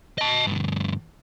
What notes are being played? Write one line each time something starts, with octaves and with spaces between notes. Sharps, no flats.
D#5 A5
D2 G2